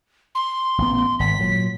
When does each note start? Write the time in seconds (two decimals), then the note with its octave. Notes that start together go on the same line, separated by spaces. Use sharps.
0.35 C6
0.78 A1 B3
1.19 G#1 B6
1.39 A#2 F#3